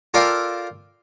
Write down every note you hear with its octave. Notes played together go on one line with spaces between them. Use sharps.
F4 A4 A#4 D5 F5 G5